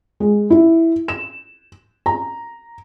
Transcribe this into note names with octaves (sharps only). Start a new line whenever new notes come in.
G#3
E4
E7
A#5